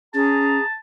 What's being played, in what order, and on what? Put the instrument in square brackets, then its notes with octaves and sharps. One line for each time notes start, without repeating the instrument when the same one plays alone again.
[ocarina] C#4 [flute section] G#4 A#5 [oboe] A5